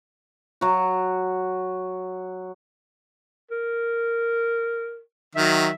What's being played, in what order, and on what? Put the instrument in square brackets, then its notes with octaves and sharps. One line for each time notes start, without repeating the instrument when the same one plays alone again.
[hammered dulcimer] F#3 F#4
[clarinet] A#4
[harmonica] D#3 F#3 [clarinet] E5